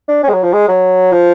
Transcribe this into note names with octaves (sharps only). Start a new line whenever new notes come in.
D4
C#4
G#3
F#3
F3
G#3
F#3
F3